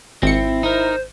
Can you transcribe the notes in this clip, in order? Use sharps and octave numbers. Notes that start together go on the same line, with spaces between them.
G#1 C4 E4 C#7
D#4 A#4 C5